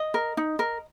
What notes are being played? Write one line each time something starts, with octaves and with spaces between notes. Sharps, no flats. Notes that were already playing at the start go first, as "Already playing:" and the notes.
Already playing: D#5
A#4
D#4
A#4